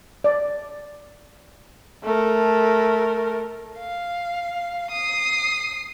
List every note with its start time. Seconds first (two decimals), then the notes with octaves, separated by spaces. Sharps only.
0.24 D5
2.04 A3 A#4
3.79 F5
4.91 D#6 C7